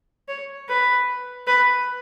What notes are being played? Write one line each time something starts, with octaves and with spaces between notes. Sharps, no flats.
C#5
B4
B4